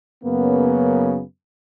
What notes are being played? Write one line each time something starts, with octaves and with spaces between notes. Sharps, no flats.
F#2 C#3 F#3 A#3 B3